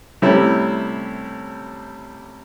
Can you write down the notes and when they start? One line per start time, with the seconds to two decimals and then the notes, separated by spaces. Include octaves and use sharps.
0.22 C3 G3 A3 C#4 E4